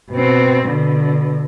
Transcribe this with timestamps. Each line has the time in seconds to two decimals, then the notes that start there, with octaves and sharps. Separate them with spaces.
0.12 B2 C4
0.65 B2 D3